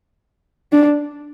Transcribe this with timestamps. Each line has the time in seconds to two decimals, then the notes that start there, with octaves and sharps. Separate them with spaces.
0.72 D4